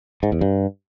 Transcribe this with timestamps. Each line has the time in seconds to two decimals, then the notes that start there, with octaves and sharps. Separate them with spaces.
0.23 G#2
0.32 E2
0.41 G2